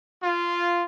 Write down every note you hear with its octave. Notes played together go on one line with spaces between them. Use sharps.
F4